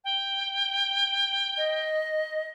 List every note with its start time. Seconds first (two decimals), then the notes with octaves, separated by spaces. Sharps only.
0.04 G5
1.57 D#5